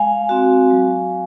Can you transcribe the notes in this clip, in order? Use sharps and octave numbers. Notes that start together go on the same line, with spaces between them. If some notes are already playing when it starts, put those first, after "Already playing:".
Already playing: G#3 F5 G#5
C4 F#4
F#3